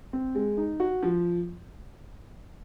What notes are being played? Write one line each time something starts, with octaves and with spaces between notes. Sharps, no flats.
C4
G#3
D#4
F#4
F3